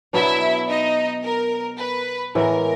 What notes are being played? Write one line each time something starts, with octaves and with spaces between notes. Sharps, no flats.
B2 F#3 B3 D4 E4 E5
D#4 D#5
A#4
B4
A2 E3 G#3 B3 A#4